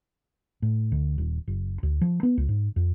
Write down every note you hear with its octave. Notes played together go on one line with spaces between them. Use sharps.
A2
D2
D#1
F#1
D2
F3
B3
C#2
G#2
F2